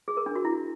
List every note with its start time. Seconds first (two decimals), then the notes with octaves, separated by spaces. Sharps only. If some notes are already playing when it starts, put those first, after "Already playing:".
0.08 G#4
0.17 A#4
0.26 D4
0.35 F#4
0.45 E4